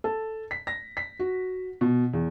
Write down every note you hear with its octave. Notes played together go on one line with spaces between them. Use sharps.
A4
B6
A#6
B6
F#4
B2
E2